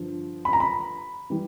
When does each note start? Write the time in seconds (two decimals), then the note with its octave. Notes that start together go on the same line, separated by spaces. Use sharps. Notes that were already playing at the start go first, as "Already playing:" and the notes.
Already playing: G2 D3 F3
0.45 B5
0.53 A#5
0.60 B5
1.30 E3 G3